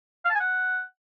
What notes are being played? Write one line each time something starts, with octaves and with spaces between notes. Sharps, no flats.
F5
A5
G#5
F#5